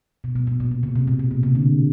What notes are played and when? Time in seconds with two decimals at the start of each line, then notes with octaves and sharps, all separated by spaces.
0.24 B2
0.35 B2
0.47 B2
0.60 A#2
0.71 B2
0.83 C#3
0.96 C3
1.07 A#2
1.19 A#2
1.31 B2
1.43 C3
1.55 D3